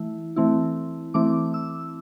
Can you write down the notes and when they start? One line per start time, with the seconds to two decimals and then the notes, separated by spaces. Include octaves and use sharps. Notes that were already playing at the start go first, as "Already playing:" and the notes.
Already playing: E3 A3 E4
0.36 E3 A3 C4 E4
1.14 E3 A3 C4 E4 D6
1.54 E6